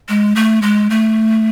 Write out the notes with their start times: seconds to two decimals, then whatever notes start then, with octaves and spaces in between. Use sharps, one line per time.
0.09 G#3
0.36 A3
0.62 G#3
0.90 A3